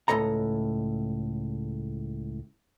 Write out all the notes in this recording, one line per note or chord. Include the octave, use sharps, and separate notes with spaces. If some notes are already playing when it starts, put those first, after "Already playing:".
C#2 A2 A4 D#5 A#5